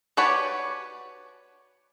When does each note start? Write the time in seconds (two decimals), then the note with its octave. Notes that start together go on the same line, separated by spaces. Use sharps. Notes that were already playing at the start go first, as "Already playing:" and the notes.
0.17 F#4 G4 B4 C#5 D5